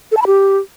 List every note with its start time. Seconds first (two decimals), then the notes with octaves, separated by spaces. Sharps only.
0.12 A4
0.17 A5
0.22 B5
0.27 G4